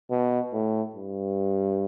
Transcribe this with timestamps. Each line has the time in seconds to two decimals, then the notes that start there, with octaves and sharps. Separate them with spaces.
0.11 B2
0.53 A2
0.95 G2